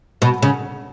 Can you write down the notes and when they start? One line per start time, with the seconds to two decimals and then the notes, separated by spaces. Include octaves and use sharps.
0.22 B2
0.42 C#3